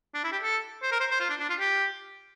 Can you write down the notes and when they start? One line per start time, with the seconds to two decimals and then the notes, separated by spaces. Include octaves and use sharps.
0.14 D4
0.24 E4
0.32 G4
0.43 A4
0.83 C5
0.92 A#4
1.00 C5
1.11 C5
1.20 F4
1.30 D4
1.40 D4
1.50 F4
1.60 G4